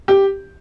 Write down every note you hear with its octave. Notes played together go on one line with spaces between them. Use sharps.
G4